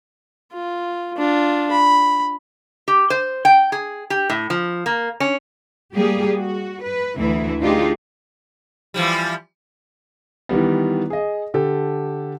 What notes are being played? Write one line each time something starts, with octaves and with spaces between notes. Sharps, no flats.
F4
D4 F4
B5
G4
C5
G5
G#4
G4
A2
F3
A#3
C#4
G3 A#3 G4 G#4
F#4
B4
D2 E3 E4
A3 D4 D#4 F4 G4 G#4
E3 F3 G3
D#3 E3 G3 B3
G#4 D#5
D3 G4 A4